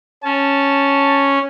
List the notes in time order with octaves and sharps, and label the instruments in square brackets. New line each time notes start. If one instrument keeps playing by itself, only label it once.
[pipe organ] C#4 [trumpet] A5